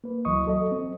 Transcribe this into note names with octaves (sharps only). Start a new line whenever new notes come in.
A#3 B4
C#2 E3 F#3 D#5 C#6 D#6
F#3 A4 D#5
C4